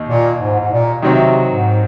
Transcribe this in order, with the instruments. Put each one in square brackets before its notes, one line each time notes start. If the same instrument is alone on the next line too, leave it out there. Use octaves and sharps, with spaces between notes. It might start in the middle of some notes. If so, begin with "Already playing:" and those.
Already playing: [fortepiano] D#2 D#4
[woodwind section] A#2
G#2
G#2
A#2
[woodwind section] C3 [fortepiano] D#3 F#3 C4 F#4
[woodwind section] G#2